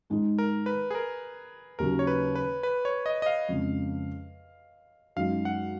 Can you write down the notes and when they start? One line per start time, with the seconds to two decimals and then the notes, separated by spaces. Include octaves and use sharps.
0.10 G#2 D#3 G#3 D#4
0.38 A#4
0.66 B4
0.91 G#4
0.95 A#4
1.79 D#2 C#3 F#3 A#4
1.99 C#5
2.07 B4
2.35 B4
2.63 B4
2.85 C#5
3.06 D#5
3.22 D#5
3.26 F5
3.49 F2 C#3 G#3
5.16 F#2 D#3 G#3 D#4 F5
5.45 F#5